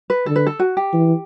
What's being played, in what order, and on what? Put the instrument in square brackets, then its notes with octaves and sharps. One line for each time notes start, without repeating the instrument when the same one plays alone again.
[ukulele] B4
[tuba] D3 [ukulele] A4
[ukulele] B4
A4
F#4
G4
[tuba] E3